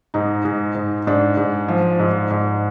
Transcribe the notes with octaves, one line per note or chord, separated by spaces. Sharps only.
G#2 D#4
G#2
G#2
G#2 D4
G#2
F3
G#2
G#2